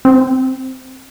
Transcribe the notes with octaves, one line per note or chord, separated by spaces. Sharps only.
C4